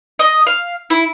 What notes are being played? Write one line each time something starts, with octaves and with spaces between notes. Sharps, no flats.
D#5
F5
E4